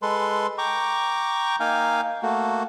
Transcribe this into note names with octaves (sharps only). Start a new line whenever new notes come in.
G#3 A4 B4 C6
G5 A#5 C#6 D6
A#3 D#4 F5 G5 G#5
A3 A#3 F#4